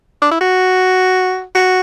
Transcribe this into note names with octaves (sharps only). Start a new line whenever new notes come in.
D4
E4
F#4
F#4